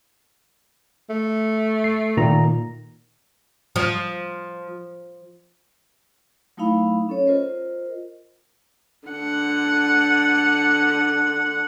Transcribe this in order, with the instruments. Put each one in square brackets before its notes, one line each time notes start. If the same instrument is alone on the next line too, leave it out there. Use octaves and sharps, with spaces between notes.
[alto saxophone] A3
[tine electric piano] C7
A#2 D#3 A#5
[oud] F3
[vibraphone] F#3 A3 D#4 E4 F5 B5
C#4 A4 C#5
F4 A#4 C5 D#5
[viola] D3 F#5